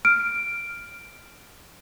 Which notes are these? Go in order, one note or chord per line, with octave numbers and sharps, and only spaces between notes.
F6 D7